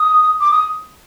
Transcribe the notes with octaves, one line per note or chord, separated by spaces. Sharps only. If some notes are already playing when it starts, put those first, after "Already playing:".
Already playing: D#6
D6
D#6